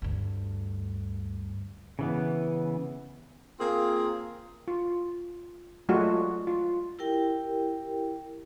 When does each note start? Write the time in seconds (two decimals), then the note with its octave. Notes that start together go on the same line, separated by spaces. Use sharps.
0.02 D2 G2
1.99 C#3 E3 B3
3.59 A#3 C4 F4 G#4
4.68 F4
5.89 F#3 G#3 A3 D4 F4 F#4
6.47 F4
6.99 E4 G4 A#4 G5